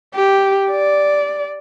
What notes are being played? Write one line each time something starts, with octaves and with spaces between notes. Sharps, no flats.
G4
D5